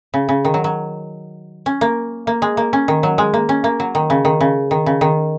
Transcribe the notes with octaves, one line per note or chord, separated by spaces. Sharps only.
C#3
C#3
D#3
F#3
F#3
C#4
A#3
A#3
G#3
A#3
C#4
D#3
F#3
G#3
A#3
C#4
A#3
F#3
D#3
C#3
D#3
C#3
D#3
C#3
D#3